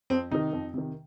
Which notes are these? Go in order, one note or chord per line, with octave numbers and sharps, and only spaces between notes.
F2 C4
C3 D#3 D#4
F2
C3 D#3